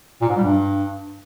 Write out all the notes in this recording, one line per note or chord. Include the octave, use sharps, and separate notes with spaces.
A#2
G#2
G3
G2